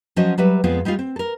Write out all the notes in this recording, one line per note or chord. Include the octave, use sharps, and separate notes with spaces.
F3 F#3 C#4 F#4 C5 D#5
F#3 G3 B4 E5
F2 G#3 B3 C4 F4 G#4
G3 G#3 D#4 F4
C4
A4 A#4